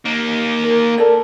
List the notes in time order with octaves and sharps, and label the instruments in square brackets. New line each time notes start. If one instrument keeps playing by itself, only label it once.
[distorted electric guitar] A#3 D#4
[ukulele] A#4
A4 A#4 D5